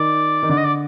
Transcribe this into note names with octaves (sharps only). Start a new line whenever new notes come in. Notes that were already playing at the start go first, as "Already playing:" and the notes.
Already playing: D#3 D5
D#3
D3 D5
D#5
D5